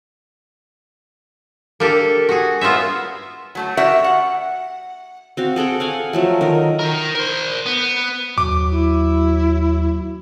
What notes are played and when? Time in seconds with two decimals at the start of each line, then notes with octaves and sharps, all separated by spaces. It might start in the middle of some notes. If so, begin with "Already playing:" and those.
1.80 A#3 D4 G4 A4
2.29 F#4 G#4
2.61 B3 F4 C5 C#5 E5
3.55 F#3 A3 A4
3.77 F#4 G4 A#4 D5 E5 F#5
4.04 F#5
5.37 C4 F#4 F5
5.56 G#4 A4 F#5 G5
5.80 F5 F#5 G#5
6.13 F3 F#3 A3
6.41 D#3 A#4
6.79 D#3 A#4
7.15 A#4 C5
7.66 B3
8.38 D#2 F#3 D6
8.71 E4